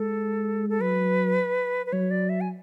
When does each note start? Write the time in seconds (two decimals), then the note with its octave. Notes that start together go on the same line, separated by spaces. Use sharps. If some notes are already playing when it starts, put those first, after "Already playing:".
Already playing: G#3 A4
0.69 A4
0.81 F#3 B4
1.86 B4
1.93 F#3 C#5
2.11 D5
2.29 E5
2.41 G#5